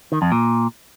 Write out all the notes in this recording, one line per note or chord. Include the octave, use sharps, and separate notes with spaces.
D#3
F2
A#2